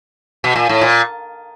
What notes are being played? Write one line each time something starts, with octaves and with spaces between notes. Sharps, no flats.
B2
A#2
A2
A#2